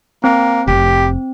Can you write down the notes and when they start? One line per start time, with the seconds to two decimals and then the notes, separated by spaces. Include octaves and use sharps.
0.24 A#3 C4
0.68 F1 G4